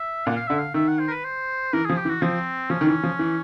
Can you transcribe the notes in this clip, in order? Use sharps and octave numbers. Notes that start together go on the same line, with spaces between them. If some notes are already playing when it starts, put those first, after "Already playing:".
Already playing: E5
A#2 F#5
F5
D3 E5
F5
D#3 E5
F#5
C5
A#4
B4
C5
E3 A#4
F3 G#4
G4
E3
F#4
F3 C4
F3 C#4
D#3
E3
F3
E3